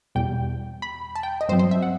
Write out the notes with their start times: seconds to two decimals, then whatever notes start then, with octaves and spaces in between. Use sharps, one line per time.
0.15 E2 B2 G3 G5
0.82 B5
1.15 A5
1.23 G5
1.41 D#5
1.49 G2 F#3 C4 C5
1.59 C5
1.71 E5
1.82 F#5